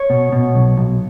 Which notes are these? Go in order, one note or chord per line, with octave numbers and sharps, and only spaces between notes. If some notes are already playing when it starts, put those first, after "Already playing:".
Already playing: C#5
B2
B2
B1
B1